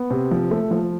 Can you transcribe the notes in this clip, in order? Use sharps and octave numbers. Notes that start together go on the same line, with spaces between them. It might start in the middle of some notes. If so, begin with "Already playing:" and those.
Already playing: B3
C3
F3
A3
F3